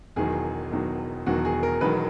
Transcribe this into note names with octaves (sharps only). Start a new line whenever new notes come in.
E1 E2 D#3 F#3 G#4
E1 E2 D#3 F#3
E1 E2 D#3 F#3 F#4
G#4
A#4
E1 E2 D#3 F#3 B4